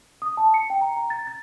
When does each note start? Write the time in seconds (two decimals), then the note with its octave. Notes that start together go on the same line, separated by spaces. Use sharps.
0.22 D#6
0.37 A5
0.54 C#7
0.70 G5
0.81 A#5
0.96 A#5
1.10 A6
1.27 A6